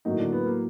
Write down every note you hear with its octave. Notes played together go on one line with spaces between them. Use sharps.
A2 D#3 F#3 A#3 D#4
D3 D4
B3
A#3